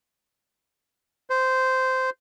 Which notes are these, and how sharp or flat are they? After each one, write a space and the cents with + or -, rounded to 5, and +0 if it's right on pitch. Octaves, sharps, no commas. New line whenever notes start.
C5 -10